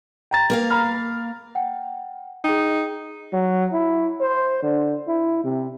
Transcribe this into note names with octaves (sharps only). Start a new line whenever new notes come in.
G5 A#5 A6
A#3 A#4 F5
A#5 B5 F6
F#5 G5
D#4 G#4 G5
F#3
E4
C5
D3
E4
C3